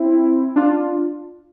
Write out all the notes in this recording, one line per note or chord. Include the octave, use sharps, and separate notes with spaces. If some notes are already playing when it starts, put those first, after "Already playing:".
Already playing: C4 E4
D4 F4